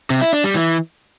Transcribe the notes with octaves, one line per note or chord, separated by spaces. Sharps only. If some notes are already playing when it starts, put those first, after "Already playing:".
C3
E4
D4
G3
E3